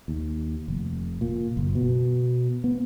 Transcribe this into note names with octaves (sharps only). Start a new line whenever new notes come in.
D#2
F1
A#2
F#1
B2
B3